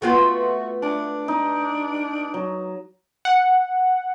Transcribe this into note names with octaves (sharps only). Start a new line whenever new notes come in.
A3 B3 F4 F#4
D4 D6
D#4
F#3
F#5